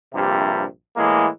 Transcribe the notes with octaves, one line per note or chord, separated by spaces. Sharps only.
A#1 G2 C3
A2 E3 G#3 A#3